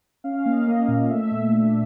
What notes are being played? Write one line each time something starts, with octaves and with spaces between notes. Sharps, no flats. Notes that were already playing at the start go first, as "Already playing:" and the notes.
C#4 F5
F5
A#3
D#5
A#3
A#2
A3 E5
A#2
D4